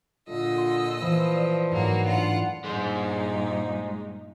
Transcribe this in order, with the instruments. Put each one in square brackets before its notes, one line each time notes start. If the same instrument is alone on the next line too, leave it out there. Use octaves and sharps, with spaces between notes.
[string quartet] A#2 D#5 E6 [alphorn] D3 [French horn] F4
[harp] C6
[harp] E3 [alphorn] F3
[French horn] D5
[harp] G#2 [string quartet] F#3 A#3 F#4
[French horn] A2 [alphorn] D4 [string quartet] F4 F#5
[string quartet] G2 A#2 D#4 [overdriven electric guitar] G#3 C5